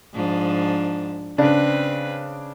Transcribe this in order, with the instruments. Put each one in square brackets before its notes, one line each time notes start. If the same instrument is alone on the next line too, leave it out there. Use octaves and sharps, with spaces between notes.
[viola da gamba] G#2 F3 D4
[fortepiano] C#3 D4 [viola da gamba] C4 B4